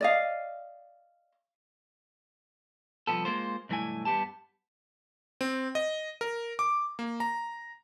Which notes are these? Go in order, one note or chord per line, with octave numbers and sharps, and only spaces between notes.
D5 D#5 F5
C2 G#2 F3 B3 A4
G#3 A#3 F4 C5
B1 G2 E3 A3 E4 G#5
G2 C#3 B3 G4 A5
C4
D#5
A#4
D6
A#3
A#5